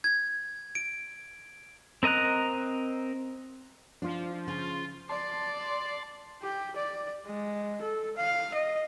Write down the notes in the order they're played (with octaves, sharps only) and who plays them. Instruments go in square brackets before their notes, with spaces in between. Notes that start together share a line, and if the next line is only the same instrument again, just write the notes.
[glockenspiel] G#6
D7
[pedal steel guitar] C4 A#4 D#5 A#5 F#6
[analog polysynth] F3 [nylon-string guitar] D4 F4
[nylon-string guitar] C#3 [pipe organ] F4
[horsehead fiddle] D5 [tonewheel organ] A5 C6
[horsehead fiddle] G4
D5
G#3
A4
F5
D#5